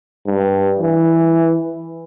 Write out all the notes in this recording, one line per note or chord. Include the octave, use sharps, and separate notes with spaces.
G2
E3